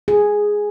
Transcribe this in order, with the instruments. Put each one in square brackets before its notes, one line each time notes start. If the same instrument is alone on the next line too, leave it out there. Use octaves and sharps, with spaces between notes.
[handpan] G#4